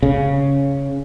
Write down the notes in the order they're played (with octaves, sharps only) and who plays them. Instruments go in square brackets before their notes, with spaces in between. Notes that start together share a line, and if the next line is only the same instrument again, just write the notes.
[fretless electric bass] C#3